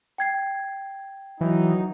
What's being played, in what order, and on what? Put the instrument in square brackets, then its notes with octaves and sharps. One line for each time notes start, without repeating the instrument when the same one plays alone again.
[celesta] G5 G#6 C7
[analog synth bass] E3 [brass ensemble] F#3 D#4